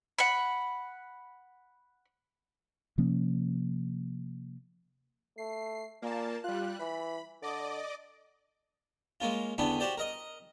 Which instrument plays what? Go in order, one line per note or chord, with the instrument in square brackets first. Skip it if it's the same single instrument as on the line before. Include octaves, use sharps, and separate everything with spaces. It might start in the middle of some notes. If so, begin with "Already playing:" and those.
[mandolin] F#5 B5
[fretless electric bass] C3 F3 A#3 C#4
[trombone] A3 [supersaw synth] C7
[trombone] A#2 [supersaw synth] A#3 A5
[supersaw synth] G3 F#6 [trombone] F4
[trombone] E3 [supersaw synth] B5
[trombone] D3 [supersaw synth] D5 D#5 D6
[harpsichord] G#3 A#3 C#4 F4
E2 D3 B3 C#4 D4 G5
F#4 G4 C5 D5
A#4 D#5